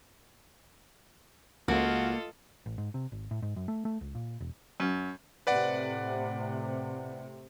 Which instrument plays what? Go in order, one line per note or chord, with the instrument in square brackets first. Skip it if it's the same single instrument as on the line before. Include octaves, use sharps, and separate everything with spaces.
[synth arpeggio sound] C#2 [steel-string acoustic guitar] A#3 [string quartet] F4 A4 D#5 [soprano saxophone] F#4
[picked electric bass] A1
G#2
C3
G#1
A2
G#2
F#2
A3
A3
C#2
A#2
E1
[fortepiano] F#2
[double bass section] A2 C3 [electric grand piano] B4 D5 F#5